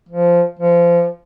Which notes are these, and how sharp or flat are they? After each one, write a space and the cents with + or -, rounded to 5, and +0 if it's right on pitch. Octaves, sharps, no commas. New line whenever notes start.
F3 -10
F3 -25